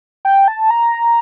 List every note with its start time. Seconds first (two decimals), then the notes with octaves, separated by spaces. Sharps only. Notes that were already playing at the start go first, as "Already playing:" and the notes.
0.25 G5
0.48 A5
0.70 A#5